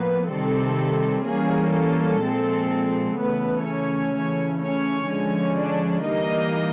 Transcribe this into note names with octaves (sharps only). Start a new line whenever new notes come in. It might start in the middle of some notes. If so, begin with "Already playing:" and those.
Already playing: A2 F3 A#3 B3 B4
C3 D#3 G3 C4 A4
E3 G3 A#3 C#4 G#4
A4
A#2 F3 G#3 C4
C#3 E3 A3 B3 B4
C#4 C#5
C#3 E3 A3
C#4 C#5
D3 F3 G#3 C#4
D4 D5
E3 G3 A#3 D#4 D#5